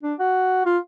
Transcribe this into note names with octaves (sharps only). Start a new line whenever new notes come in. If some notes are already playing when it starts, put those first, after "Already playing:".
D4
F#4
F4